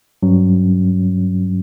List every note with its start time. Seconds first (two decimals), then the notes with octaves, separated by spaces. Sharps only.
0.23 G2 F#3 C#4